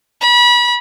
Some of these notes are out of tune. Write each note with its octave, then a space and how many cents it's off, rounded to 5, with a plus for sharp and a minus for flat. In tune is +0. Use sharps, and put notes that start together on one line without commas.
B5 -30